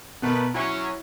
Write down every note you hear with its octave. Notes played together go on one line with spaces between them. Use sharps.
B2 A3 B3 A#4 B4
F#3 C#4 E4